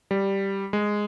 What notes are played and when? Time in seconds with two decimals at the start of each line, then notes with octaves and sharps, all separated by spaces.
0.11 G3
0.73 G#3